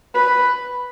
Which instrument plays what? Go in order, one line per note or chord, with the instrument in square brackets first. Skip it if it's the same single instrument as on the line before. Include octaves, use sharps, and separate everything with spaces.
[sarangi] B4